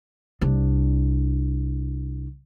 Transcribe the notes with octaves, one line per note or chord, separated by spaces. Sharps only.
C2 D4